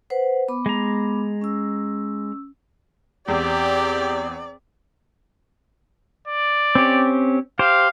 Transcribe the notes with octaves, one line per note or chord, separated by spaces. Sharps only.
B4 C5 F#5
B3 B5 D6
G#3 A#5
C#4 E6
E2 C4 G4 D5
D5
C4 C#4 G4
G4 C5 F5